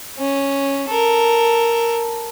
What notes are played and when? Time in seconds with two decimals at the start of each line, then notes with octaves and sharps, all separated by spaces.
0.19 C#4
0.90 A4 A#4